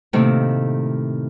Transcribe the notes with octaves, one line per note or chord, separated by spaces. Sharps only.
A2 C3 D#3 A3 A#3